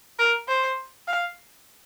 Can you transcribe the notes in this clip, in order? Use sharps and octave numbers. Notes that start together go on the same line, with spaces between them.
A#4
C5
F5